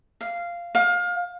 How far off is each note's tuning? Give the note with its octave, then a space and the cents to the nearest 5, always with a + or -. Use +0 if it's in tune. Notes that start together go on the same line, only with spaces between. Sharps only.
F5 -10
F5 +25